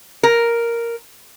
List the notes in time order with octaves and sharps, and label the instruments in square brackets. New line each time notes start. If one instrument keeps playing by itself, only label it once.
[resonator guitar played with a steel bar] A#4